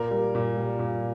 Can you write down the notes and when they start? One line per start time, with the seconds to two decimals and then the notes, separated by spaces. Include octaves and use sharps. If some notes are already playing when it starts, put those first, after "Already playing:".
Already playing: A#2 A#4
0.11 G3
0.35 A#2
0.57 G3
0.79 A#2